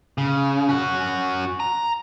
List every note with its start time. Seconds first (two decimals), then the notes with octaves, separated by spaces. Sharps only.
0.18 C#3
0.69 C#4 F#4
1.60 A#5